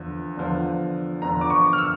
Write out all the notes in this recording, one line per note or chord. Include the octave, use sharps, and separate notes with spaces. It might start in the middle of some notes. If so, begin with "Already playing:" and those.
Already playing: E2 D3 F3
E2 D3 F3
E2 D3 F3 A#5
D6
C#6
F6
E6